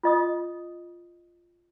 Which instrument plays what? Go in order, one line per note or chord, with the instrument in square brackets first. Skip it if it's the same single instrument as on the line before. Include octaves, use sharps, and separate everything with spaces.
[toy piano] F4 D#5 D#6